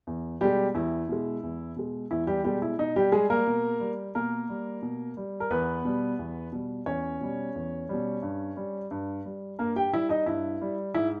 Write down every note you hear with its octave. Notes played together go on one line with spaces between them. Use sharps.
E2
B2 G3 G#3 G4
E2 E4
B2 G#3
E2
B2 G#3
E2 E4
G3 G4
B2 G3 G#3 G4
E4
B2 D#4
G3 G4
G3 G#3 G#4
A#3 A#4
B2
G3
B2 A#3 A#4
G3
B2
G3
A#4
E2 B3 B4
B2 G3
E2
B2 G3
E2 C#4 C#5
B2 G3
E2
B2 G3
G2
G3
G2
G3
G2 A#3 A#4
G4 G5
G3 E4 E5
D#4 D#5
G2 E4
G3
G#2 E4